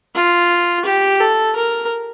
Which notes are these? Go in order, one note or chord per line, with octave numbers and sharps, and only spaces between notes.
F4
G4
A4
A#4